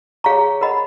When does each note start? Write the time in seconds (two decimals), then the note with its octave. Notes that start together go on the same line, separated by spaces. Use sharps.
0.24 G#4 C#5 F5 A#5 C#6
0.61 A#4 D#5 F#5 B5